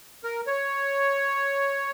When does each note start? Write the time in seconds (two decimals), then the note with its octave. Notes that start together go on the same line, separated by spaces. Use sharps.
0.24 A#4
0.47 C#5